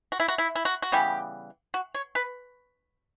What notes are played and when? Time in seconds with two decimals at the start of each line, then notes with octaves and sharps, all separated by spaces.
0.12 F#4
0.20 E4
0.28 F#4
0.38 E4
0.55 E4
0.65 F#4
0.82 F#4
0.92 C#3 E3 G3 B3 G4
1.74 F#4
1.94 C#5
2.15 B4